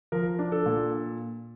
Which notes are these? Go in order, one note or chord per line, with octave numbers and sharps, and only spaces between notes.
F3 A#4
D4
A4
A#2